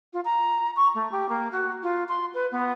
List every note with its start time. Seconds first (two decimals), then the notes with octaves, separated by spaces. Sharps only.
0.13 F4
0.25 A#5
0.76 C#6
0.95 A3
1.12 G4
1.29 A#3
1.52 F#4
1.83 F4
2.09 C6
2.34 B4
2.52 B3